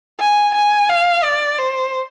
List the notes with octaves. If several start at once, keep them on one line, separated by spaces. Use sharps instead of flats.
G#5
G#5
F5
D5
C5